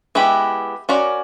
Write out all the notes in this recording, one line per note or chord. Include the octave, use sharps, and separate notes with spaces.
G#3 B3 E4 G4
C#4 F#4 A#4 D5